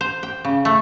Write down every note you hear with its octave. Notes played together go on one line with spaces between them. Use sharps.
C5
G5
C#3
A3